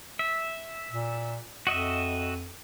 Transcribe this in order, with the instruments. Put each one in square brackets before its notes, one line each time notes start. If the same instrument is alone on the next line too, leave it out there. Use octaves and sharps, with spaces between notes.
[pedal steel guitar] E5
[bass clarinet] A#2
[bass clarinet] F2 [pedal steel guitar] F#4 D#5 E5